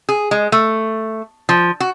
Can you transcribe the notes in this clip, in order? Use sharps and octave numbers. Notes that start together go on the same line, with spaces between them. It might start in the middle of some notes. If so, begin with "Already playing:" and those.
G#4
G#3
A3
F3
F#4